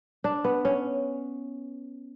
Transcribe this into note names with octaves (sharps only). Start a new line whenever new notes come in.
D4
B3
C#4